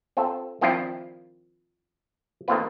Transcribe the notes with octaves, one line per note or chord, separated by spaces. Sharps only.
C4 F4 A4
D#3 F3 C4 D4 E4 F4
D#3 A3 A#3 C4 F4 B4